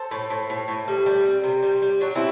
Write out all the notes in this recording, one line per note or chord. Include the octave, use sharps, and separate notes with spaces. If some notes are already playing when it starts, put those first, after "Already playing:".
Already playing: A4 C5
A2
A2
A2
A2
G3
G3
C4
C3
G3
G3
F#3 D4 F#4
C4 E4